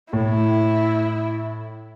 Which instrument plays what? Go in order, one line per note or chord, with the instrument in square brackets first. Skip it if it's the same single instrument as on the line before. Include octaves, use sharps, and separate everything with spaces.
[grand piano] A2 [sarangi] E4